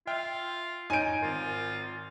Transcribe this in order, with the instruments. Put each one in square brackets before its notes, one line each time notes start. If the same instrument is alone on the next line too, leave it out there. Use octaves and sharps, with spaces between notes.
[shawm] F4 [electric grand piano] E5 G5 F6
[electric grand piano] D#4 C#5 G6 [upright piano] G#5 D7
[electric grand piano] G#1 A#4 [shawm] F4